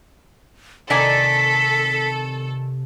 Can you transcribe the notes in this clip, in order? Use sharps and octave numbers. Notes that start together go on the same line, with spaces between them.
C3 D#3 A4 D5 G#5 B6